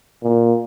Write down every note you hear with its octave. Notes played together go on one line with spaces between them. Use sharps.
A#2